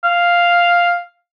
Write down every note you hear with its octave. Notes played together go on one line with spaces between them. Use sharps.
F5